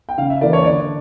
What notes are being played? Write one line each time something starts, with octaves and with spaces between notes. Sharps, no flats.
G5
C#3 F5
E5
E3 A#3 D5
C#5
D3 D5